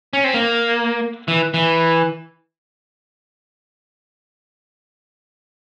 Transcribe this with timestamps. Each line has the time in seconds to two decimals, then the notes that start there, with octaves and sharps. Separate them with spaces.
0.13 C#4
0.24 C4
0.34 A#3
1.28 E3
1.54 E3